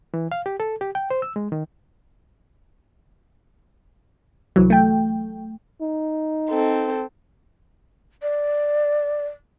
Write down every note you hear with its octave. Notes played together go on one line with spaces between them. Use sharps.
E3
F5
G4
A4
G4
G5
C5
E6
G#3
D#3
C2 E3 F#3
A3 G5
D#4
C4 A4
D5